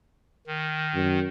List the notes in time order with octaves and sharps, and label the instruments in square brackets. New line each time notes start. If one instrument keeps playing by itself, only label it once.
[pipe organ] D#3
[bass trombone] F#2